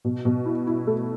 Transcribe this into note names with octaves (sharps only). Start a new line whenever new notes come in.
B2
B2
E4
E4
A3